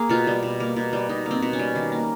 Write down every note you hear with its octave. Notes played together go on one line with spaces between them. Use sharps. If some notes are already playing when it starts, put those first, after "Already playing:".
Already playing: A#3 G#4
B2 F4
G3
B2
A#3
B2
G3
B2 D#4
A#3 C4
B2
C#4
G3
D#3
A#3